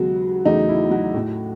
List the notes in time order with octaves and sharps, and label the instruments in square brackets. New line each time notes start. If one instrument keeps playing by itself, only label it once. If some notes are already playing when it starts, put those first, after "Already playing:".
Already playing: [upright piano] D#2 C#3 F#3 G#3 B3 F#4
E2 C#3 F#3 A3 D#4
E4
F#3 F#4
A2 F#3 A3